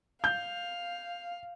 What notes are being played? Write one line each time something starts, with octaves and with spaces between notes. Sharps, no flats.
F5 G6